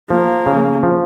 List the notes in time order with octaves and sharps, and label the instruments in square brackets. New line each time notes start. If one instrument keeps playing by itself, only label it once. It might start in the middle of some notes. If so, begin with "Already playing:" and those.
[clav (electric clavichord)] F3 [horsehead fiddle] A#3
[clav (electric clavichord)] C#3
F3